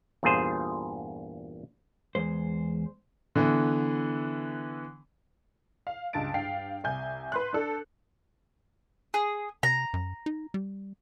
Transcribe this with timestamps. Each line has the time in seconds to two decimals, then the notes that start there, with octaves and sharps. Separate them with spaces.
0.23 E2 G2 A#2 F4 G#4 C5
2.15 E2 G#3 C5
3.35 D3 E3 B3
5.87 F5
6.13 C#2 G2 A5 A6 D7
6.34 G2 F5 G5 C7
6.84 C2 G#5 G6
7.32 B4 C6 F#6
7.53 D4 A4
9.14 G#4
9.63 C3 A#5
9.94 F#2
10.26 D#4
10.54 G3